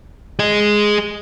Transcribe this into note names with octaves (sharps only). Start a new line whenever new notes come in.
G#4 D#5